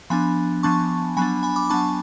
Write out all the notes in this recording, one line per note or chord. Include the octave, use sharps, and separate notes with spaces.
F3 B3 D4 G#5 B5
F3 B3 D4 A5 C#6
F#3 B3 D4 G#5 B5
G#5 B5
B5 D6
F#3 B3 D4 A5 C#6